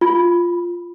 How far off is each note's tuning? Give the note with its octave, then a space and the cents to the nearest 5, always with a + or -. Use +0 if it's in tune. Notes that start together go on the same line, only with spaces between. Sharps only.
F4 +0 B5 +0